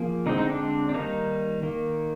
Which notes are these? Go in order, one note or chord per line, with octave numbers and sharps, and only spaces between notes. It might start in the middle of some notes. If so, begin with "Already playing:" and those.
Already playing: F3 A#3 G#4
D3 G#3 C4 D#4
D#4
D4
D4
D#3 G3 A#3 D#4
D#3 A#3